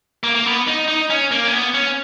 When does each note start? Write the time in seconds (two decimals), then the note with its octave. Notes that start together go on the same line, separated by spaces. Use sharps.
0.24 A#3
0.35 A#3
0.46 B3
0.68 D#4
0.88 D#4
1.10 C#4
1.31 A#3
1.48 C#4
1.53 B3
1.74 C#4